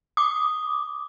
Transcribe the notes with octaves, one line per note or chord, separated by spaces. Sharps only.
D6 D#6